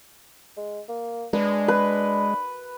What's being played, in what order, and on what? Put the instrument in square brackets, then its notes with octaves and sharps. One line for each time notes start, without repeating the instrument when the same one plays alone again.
[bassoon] G#3
A#3
[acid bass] G#3 [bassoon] D4 [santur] B4
[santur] B4